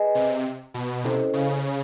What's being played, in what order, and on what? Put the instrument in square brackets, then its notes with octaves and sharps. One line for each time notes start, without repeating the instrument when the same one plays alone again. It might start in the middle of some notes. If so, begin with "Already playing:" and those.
Already playing: [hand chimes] G#4 B4 D#5 G#5
[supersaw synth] C3
B2
[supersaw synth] C3 [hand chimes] C#4 E4 A4 C5 D#5
[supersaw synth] C#3